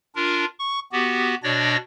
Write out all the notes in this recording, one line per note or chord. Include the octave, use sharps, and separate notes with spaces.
D4 F4 A#4
C#6
B3 F#4 G4
B2 D4 C#5 D5 A#6